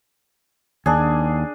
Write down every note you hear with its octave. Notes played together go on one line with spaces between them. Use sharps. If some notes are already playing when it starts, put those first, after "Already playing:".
D#2 D4 G#4